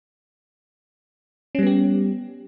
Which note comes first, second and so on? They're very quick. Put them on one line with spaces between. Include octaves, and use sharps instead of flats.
C#4 G3 B3 G4